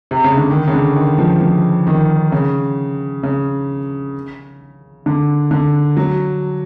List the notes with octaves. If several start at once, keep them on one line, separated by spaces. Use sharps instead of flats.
C3
C#3
D3
D#3
C#3
D3
D#3
F3
F3
D#3
C#3
C#3
D3
D3
F#3